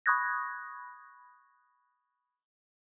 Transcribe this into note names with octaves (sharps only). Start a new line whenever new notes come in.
B5 C#6 D#6 F#6 G#6 A#6